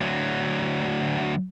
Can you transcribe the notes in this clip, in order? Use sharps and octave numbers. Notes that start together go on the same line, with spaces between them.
D2 F#3